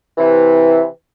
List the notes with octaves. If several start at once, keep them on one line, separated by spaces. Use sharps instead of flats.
C3 E3